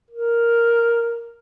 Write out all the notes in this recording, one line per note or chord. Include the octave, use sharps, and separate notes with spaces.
A#4